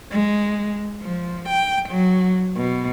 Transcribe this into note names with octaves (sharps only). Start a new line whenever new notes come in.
G#3
F3
G5
F#3
B2